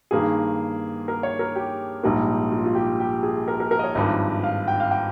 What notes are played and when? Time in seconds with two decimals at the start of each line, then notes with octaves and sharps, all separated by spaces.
0.11 G2 D#3 A#3 G#4
1.08 A#4
1.23 C#5
1.39 A#4
1.55 G4
2.03 A#1 G#2 G3 A#3
2.51 F4
2.66 F4
2.75 G4
3.00 G4
3.23 G#4
3.48 A#4
3.60 A#4
3.71 A#4
3.79 D#5
3.84 C#5
3.95 G#1 G2 F3 D#5
4.44 F5
4.68 G5
4.80 F5
4.91 G5